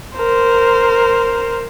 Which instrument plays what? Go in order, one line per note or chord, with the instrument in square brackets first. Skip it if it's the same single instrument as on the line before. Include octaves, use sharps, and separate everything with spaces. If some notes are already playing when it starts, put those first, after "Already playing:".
[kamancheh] A#4 C5